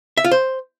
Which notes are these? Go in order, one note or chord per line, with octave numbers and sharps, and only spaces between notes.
E5
F4
C5